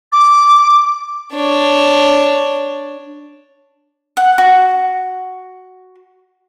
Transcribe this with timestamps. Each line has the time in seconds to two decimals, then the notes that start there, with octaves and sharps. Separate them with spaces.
0.12 D6
1.32 D4 C#5
4.17 F#5
4.38 F#4